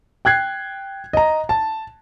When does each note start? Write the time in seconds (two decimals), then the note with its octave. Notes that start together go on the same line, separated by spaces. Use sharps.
0.25 G5 F#6 G#6 C7
1.13 D#5 A#5
1.49 A5